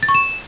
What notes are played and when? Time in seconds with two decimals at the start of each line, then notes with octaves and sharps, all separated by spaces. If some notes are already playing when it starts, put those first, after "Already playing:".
0.03 A6
0.09 C#6
0.14 E7